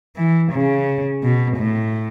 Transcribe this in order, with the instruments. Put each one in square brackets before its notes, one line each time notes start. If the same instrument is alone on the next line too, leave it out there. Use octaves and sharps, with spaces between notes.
[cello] E3
C#3
B2
A2